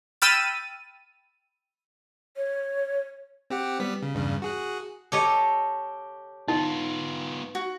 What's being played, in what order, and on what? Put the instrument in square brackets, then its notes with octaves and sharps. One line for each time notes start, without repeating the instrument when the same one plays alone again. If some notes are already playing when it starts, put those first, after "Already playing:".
[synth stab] G5 B5 E6 F6 A6 D#7
[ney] C#5
[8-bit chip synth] C4 G4 F#5
G3 B3 B6
C#3
E2 G2 C#3
F#4 G#4 F#6
[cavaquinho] G4 D6 [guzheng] A4 C#5 D#5
[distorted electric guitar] B3 F4 [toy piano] D#4
[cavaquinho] F#4